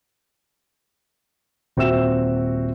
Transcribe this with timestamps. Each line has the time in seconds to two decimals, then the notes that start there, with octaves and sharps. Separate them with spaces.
1.77 D#1 C4 F#4 E5 E6 E7